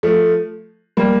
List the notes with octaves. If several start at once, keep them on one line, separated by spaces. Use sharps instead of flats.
F3 A3
G3 A#3